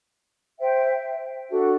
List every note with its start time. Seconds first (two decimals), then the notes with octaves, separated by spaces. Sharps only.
0.59 C5 E5 G5
1.49 D4 F#4 A4